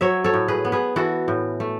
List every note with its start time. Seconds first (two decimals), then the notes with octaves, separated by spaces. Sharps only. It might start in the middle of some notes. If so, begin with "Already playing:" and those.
0.01 F#3 C#5 E5
0.24 A4 C#5
0.34 A2
0.48 G#4 B4
0.65 B3
0.72 G#4 B4
0.96 E3 F#4 A4
1.28 A2
1.60 A3